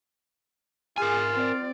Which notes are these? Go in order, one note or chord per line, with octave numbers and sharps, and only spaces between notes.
F4 G#4 A#4 G#5
C4 D5